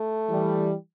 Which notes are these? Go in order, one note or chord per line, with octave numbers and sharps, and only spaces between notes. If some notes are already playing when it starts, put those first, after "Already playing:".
Already playing: A3
E3 G3